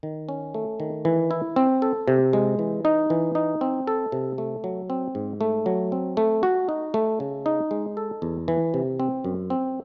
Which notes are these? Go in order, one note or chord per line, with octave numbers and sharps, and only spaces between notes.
D#3
C#4
A3
D#3
E3
E4
C4
A4
C3
G#3
E3
D#4
E3
D#4
C4
A4
C3
A3
F#3
C4
G#2
A3
F#3
C4
A3
F#4
D#4
A3
C#3
D#4
G#3
A4
E2
E3
C3
C4
F#2
C4